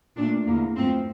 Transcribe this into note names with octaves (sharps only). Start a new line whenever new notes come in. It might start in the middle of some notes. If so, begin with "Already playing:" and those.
A#2 A3 D4
E2 D3 A3 A#3
G2 F3 A3 C4